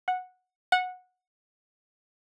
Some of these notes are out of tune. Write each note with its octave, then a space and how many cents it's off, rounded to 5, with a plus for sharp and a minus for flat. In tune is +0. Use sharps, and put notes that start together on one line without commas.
F#5 -10
F#5 -15